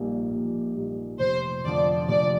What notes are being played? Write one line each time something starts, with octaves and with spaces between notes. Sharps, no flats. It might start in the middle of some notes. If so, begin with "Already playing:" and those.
Already playing: A#1 A#2 G3 A#3 D#4
A#1
A#2 G3 A#3 D#4
F1 C5
F2 D3 F3 D5
F1 D5